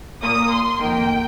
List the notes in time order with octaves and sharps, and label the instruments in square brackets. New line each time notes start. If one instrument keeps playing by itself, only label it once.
[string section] A#2 A#3 D#6
C6
F2 D#3 A#3 G5